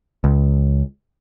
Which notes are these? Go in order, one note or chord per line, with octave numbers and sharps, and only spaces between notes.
C#2